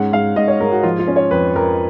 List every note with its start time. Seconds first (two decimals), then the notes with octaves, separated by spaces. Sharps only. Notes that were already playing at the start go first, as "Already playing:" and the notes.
Already playing: G#2 C#4 F#5
0.12 G#2 F5
0.36 G#2 D#5
0.48 C#5
0.60 G#2 A#4
0.72 F#4
0.83 F3 F4
0.99 F4
1.07 C#4
1.16 C#5
1.31 F2 B4
1.55 F2 A#4